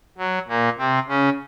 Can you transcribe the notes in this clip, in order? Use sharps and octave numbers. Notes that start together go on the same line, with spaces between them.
F#3
A#2 A#3
C3 C4
C#3 C#4